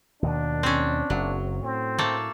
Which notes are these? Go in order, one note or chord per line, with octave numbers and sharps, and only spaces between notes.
D#2 B2 D#3 D4
C4 C#4
F#1 F#3
A2 C4
A3 A#3 A4